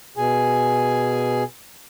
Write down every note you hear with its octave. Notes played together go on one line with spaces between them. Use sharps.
B2 G#4 G#5